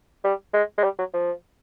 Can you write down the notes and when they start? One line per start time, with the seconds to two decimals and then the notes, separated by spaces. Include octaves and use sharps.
0.25 G3
0.54 G#3
0.78 G#3
0.84 G3
0.99 F#3
1.14 F3